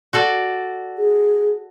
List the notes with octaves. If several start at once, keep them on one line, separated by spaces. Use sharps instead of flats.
F#4 A4 D5
G#4